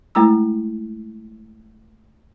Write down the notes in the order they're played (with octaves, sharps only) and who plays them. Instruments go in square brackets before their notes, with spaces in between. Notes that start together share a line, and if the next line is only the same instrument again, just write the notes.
[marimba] G#3 A3 E4 A#5 E6